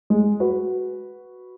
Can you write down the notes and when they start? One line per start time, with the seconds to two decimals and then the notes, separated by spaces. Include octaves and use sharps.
0.10 G#3
0.40 F#4 B4